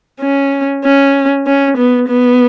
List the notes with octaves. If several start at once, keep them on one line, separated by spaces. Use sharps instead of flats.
C#4
C#4
C#4
B3
B3